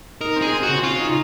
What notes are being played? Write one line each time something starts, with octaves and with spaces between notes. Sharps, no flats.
D#4 A#4
C4
G#4
C4
F#4
C#3
C#3 F4
D#4